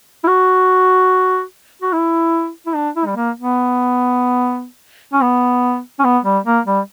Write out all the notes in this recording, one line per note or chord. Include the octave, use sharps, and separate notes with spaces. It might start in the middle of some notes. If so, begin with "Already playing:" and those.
E4
F#4
F#4
E4
E4
D4
E4
G3
A#3
B3
C#4
B3
C#4
B3
G3
A#3
G3